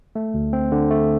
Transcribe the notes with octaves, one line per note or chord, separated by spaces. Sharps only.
A3
D2
C4
D3
A3